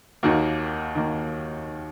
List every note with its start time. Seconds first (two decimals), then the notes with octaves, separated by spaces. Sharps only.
0.23 D#2 D#3 A#3 F#4
0.95 D#3 A#3